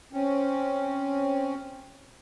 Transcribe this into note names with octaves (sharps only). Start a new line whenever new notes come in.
C4 C#4